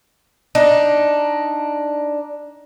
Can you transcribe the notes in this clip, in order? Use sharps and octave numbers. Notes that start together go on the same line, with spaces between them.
D4 D#4